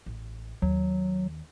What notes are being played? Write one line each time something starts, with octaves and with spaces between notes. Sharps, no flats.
A1
D#2 F#3